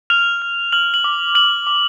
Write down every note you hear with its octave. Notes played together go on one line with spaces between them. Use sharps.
F6 F7
F6
F6 F#7
F#7
D6
F6 F#7
D6